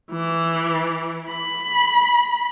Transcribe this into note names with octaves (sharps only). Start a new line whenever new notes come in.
E3
B5